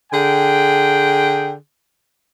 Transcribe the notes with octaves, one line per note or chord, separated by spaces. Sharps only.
D3 G#4 G5